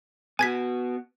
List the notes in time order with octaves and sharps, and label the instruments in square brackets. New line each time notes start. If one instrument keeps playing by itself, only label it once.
[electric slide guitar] B3 F#4 [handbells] G#5 G#6 B6